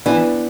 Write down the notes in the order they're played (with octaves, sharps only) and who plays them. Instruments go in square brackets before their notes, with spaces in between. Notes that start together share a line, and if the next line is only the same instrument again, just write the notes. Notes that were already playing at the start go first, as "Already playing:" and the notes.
[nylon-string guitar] E3 [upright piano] B3 D4